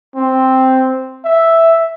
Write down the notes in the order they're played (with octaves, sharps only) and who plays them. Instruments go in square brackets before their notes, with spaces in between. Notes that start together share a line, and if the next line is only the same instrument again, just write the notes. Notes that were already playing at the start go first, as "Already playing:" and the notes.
[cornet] C4
E5